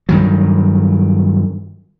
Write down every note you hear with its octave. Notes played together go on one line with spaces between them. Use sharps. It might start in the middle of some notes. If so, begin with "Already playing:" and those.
G2 D#3 F#3